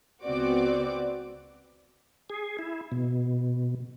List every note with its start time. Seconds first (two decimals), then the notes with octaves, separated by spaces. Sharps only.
0.24 C#2 B3 C4 F#4 D5 D6
2.30 G#4
2.59 E4
2.92 B2